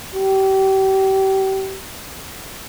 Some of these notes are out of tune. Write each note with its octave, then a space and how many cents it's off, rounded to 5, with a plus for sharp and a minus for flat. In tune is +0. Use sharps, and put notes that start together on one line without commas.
G4 -30